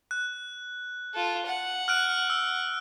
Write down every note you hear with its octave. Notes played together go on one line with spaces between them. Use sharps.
F#6
F4 A4
F#5
F6 F#6 D7
E6